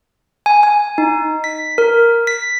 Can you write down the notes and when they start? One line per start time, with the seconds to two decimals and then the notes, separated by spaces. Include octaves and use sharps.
0.46 G#5
0.63 G#5
0.98 D#4
1.44 B6
1.78 A#4
2.27 B6